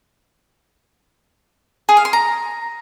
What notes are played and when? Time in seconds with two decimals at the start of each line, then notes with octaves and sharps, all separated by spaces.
1.89 G#4
1.97 F5
2.05 C6
2.13 A#5